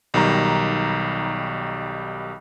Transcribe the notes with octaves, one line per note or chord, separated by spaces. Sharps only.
B1 D#3 G3 A#5